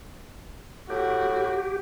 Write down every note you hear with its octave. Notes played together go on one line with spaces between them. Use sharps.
A2 F#4 G4